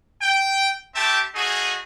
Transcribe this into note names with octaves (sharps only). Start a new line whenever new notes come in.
G5
A3 C4 G4 E5 G5 A5
A3 D#4 F#4 G#4